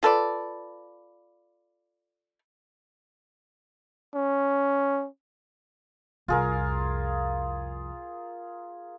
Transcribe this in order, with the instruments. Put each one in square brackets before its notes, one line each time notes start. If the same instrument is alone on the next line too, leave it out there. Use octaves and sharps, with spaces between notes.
[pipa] F4 A4 B4 D5
[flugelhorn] C#4
[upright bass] C2 F2 [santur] F4 G#4 A#4